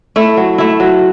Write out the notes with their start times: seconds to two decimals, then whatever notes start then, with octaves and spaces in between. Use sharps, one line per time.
0.16 A3 E4
0.37 F#3
0.58 A3 E4
0.80 F#3